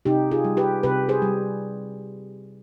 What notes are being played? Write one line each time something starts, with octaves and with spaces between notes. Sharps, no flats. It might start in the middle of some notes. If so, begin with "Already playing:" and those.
C3 D#4 G4
F4 G#4
G3
G4 B4
C3 G4 B4
G#4 C5
G3